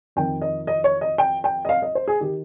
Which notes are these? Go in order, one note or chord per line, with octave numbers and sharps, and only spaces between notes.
F2 D#3 G5
D#5
D#5
C#5
D#5
G5
G5
D#5
F5
D#5
C5
G#4
D#3 G4